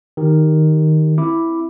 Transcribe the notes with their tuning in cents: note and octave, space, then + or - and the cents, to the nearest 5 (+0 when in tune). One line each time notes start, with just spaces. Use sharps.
D#3 +0 G4 +0
C4 +0 E4 +0 D6 +0